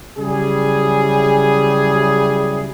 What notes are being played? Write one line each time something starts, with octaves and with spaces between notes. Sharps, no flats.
C#3 F#3 G3 E4 G#4